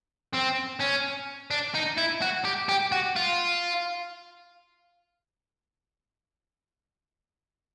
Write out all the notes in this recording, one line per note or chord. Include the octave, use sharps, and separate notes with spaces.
C4
C#4
D4
D#4
E4
F#4
G4
G4
F#4
F4